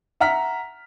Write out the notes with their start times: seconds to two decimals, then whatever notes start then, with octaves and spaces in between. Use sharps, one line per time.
0.20 E5 F#5 A#5 F6 B6